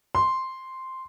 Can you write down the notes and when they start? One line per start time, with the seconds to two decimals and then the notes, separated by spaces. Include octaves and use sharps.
0.15 C6